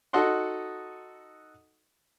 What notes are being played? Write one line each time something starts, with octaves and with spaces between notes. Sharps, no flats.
D#4 F#4 A4 D#5 F#5 C6